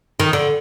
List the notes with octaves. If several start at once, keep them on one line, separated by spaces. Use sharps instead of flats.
D#3
D3